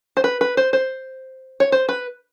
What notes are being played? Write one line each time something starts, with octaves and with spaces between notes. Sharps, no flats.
C5
B4
B4
C5
C5
C#5
C5
B4